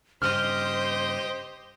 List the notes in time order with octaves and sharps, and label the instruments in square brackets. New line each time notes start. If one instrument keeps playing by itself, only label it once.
[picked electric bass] G2 C#3 [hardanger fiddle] G4 D#5 [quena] C5 [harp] F6